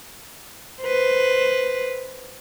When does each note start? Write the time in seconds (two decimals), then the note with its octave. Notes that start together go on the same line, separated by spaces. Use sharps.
0.82 B4 C5